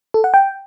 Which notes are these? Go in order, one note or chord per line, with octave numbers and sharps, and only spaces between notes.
A4
F#5
G5